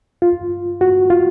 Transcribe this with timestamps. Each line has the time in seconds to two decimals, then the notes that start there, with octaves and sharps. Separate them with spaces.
0.22 F4
0.81 F#4
1.10 F4